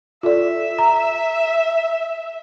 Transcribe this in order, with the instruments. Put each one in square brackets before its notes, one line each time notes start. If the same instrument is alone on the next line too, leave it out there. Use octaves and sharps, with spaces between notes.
[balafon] F4 A4 D5 [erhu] E5
[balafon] A#5